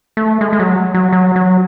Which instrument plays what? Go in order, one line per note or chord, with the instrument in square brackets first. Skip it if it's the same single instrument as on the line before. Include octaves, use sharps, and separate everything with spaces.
[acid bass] A3
G#3
G#3
F#3
F#3
F#3
F#3